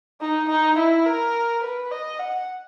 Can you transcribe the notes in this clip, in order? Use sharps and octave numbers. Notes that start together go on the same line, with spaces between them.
D#4
D#4
E4
A#4
B4
D#5
F#5